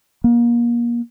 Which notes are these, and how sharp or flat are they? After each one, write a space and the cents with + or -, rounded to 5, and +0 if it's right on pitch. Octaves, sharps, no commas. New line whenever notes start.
A#3 +30